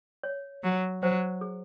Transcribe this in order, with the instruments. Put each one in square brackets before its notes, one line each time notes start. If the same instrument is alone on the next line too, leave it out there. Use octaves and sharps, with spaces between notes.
[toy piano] C#5
[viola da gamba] F#3
[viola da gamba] F#3 [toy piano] C5
[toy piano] G#4